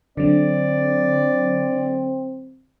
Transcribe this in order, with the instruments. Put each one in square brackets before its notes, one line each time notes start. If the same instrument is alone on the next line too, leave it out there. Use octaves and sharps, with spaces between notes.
[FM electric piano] D3 F#3 [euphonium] C4 [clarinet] D5